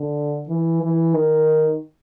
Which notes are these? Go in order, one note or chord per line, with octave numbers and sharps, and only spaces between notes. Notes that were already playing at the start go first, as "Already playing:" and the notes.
Already playing: D3
E3
E3
D#3